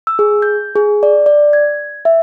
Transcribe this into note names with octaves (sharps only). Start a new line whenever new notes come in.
E6
G#4
G6
G#4
D5
D5
G#6
E5